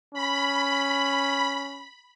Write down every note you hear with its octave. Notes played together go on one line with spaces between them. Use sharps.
C#4 B5